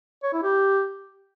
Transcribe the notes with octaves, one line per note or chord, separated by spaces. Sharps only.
C#5
E4
G4